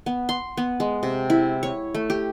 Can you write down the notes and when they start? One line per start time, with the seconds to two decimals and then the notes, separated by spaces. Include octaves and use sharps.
0.06 B3
0.29 C6
0.57 B3
0.80 G#3
1.03 C3
1.30 E4
1.63 C#5
1.95 A3
2.10 G4